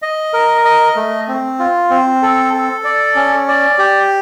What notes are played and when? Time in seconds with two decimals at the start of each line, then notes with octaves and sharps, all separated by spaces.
0.02 D#5
0.33 A#4
0.65 D#5
0.96 A3
1.28 C4
1.59 F4
1.90 C4
2.22 A4
2.54 A4
2.84 D5
3.15 C#4
3.48 D5
3.79 G4